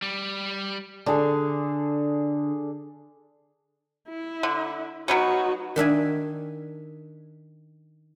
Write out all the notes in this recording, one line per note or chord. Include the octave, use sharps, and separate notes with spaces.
G3
D3 D4 G#4 A4
E4
D3
F#3 B3 C#4 D#4 F#4
D#3 D4 E5 G#5